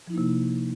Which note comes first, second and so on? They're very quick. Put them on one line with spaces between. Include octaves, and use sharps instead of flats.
F3 E4 D#4 A#3 C3